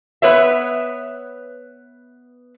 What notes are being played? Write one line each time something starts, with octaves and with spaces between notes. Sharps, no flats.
B3 B4 C#5 E5